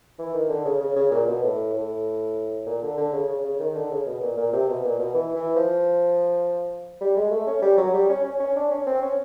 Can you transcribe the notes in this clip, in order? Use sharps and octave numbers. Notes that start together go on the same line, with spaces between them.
E3
D#3
D3
C#3
C#3
C#3
A#2
B2
A2
A2
A#2
D3
D3
C#3
C#3
C#3
D#3
D3
C#3
B2
A#2
A#2
C3
B2
A#2
B2
E3
E3
F3
G3
G#3
A3
C#4
G3
F#3
G3
C#4
C#4
C#4
D4
C#4
C4
C#4